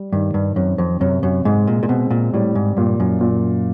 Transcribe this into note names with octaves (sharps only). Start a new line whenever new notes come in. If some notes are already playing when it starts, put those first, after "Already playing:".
Already playing: G3
G2 D#3
G2
F#2 C4
F2
F#2 C3
F#2
G#2 G#3
A#2
A#2
B2 C4
A#2
A2 G3
G#2
G2 A#2
F#2
A#2